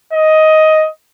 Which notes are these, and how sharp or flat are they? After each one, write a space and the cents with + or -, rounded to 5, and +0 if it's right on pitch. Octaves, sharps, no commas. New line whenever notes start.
D#5 +10